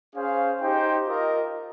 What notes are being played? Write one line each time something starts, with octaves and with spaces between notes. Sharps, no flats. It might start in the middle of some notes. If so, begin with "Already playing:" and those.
C#4 G#4 C5 F5
D#4 G4 C5 G5
F4 A#4 D#5